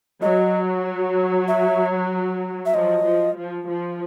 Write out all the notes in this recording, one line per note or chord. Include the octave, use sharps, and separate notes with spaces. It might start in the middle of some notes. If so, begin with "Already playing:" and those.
F#3 D#5
E5
E5
F3 D#5
F3
F3
F3